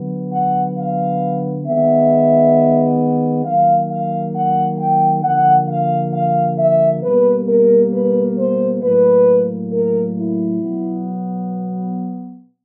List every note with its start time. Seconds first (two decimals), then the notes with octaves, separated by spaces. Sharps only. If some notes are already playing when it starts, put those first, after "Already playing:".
Already playing: D3 F#3 B3
0.32 F#5
0.76 F5
1.66 D#3 G#3 B3 E5
3.45 D#3 F#3 A#3 F5
3.90 F5
4.34 F#5
4.79 G5
5.24 D3 F3 A#3 F#5
5.69 F5
6.13 F5
6.58 E5
7.03 B2 G3 A#3 B4
7.48 A#4
7.93 B4
8.37 C5
8.82 A2 F#3 A#3 B4
9.72 A#4
10.16 E4
10.61 B2 F#3 B3